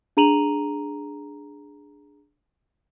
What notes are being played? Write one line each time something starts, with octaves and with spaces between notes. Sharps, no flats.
D4 G#4 A#5 D#7 F7 F#7